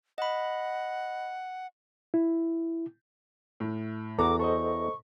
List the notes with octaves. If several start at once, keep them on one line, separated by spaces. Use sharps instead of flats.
D#5 F#5 B5
E4
A2
E2 F#4 A4 A#5 D6
A4 C5 D#5 C#6